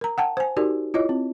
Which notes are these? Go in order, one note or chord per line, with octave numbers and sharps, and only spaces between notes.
A#4 A#5
F#5 G5 A5
C5 G#5
D#4 F#4 G4 A#4 D5
E4 F4 C#5 D#5
C4